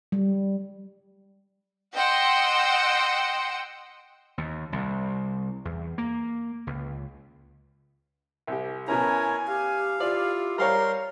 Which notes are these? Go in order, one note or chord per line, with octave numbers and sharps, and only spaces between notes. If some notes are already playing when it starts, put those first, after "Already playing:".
G3
D#5 F#5 G5 C6 E6
D#2
C2
E2
A#3
C#2
C2 G4
B2 C#4 E4 A#4 C#5 G#5 A#5
G4 F5
E4 F4 D5
G3 A#4 C#5 F5 A#5 C6